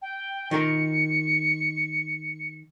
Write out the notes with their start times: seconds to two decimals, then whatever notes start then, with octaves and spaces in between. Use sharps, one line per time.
0.01 G5
0.51 D#3 F4 A#4 C#7